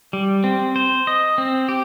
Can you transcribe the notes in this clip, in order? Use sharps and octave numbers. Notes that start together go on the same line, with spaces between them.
G3
C4
C5
D#5
C4
G4